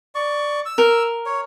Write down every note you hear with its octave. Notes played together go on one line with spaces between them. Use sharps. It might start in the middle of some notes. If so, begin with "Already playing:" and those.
D5 C#6
E6
A#4
C#5